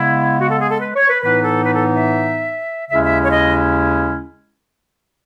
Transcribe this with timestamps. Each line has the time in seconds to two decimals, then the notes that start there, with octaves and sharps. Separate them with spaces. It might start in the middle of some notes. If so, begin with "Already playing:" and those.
Already playing: C#3 G#3 B3 E4
0.40 F#4
0.50 A4
0.61 G#4
0.71 A4
0.81 B4
0.96 C#5
1.10 B4
1.24 A2 E3 B3 D#4 B4
1.44 A4
1.65 B4
1.75 A4
1.96 E5
2.90 D#2 C#3 G#3 C#4 E4 E5
3.04 E5
3.26 C#5
3.32 D#5